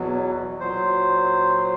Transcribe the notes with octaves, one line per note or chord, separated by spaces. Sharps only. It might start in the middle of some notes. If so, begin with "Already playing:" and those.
Already playing: E2 B2 F#3
A#2 F#3 C5